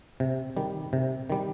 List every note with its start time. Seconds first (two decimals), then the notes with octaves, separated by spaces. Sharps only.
0.20 C3
0.57 D#3 G3
0.93 C3
1.30 D#3 G3